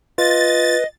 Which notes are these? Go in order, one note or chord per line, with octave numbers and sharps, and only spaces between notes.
F4 B4 D#5 A6